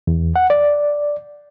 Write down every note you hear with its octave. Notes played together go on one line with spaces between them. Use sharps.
E2
F#5
D5